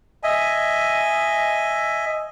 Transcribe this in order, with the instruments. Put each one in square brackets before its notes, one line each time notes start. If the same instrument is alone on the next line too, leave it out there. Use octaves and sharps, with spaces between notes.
[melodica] D#5 E5 G#5